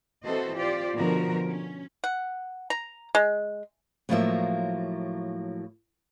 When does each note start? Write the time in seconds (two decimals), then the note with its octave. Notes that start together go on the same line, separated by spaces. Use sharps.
0.25 E3 C4 F#4 A4 C5 D#5
0.58 F4 G4 C5 D5
0.95 B2 D3 F3 F#4 A#4
1.47 C#4
2.04 F#5
2.70 A#5
3.15 G#3
4.09 A2 F3 F#3 A#3 C5 E5